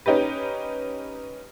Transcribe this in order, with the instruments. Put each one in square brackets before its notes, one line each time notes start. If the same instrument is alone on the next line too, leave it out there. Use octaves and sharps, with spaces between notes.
[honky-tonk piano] C#4 D#4 G4 B4